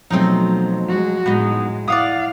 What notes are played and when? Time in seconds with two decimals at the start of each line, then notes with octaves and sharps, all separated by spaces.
0.10 B2 F3 F#3 A3 C4 D#4
0.88 G#3 F#4
1.26 A2 G#3 B3 D#4
1.88 E4 D5 F5 F#5 D#6